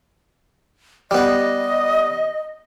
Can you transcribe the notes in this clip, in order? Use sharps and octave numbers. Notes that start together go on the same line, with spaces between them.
G3 B3 D#5